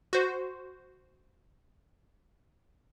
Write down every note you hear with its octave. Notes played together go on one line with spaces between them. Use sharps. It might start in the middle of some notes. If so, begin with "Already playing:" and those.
F#4 C5